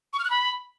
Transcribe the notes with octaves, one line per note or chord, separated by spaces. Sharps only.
C#6
F6
F#6
B5